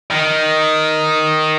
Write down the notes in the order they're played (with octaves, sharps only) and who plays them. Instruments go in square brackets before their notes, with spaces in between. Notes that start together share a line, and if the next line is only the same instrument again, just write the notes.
[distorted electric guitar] D#3